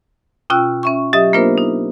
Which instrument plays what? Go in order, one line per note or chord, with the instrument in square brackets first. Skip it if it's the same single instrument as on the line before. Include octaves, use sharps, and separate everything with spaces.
[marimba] B2 C#4 F4 G5 E6 F#6
C#4 E5 C#6
F#3 G4 D#5 E5 D#6
A#3 B3 D4 F4 A#4 C5
D#4